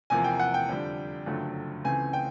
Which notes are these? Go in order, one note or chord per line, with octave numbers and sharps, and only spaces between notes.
E2 C3 F3 A#3 G#5
G5
F#5
G5
F2 D3 G3
F#1 F2 D3 F#3 A3
C#2 C#3 E3 A3 C4 G#5
G5